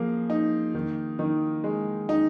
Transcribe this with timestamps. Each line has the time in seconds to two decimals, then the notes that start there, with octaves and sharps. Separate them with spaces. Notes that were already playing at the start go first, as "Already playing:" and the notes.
Already playing: F3 A#3 G#4
0.30 D#4
0.75 D#3
1.19 D#3
1.64 G#3
2.09 D#4